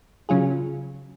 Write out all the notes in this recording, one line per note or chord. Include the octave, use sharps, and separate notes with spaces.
C#3 F#3 C#4 F4 G#4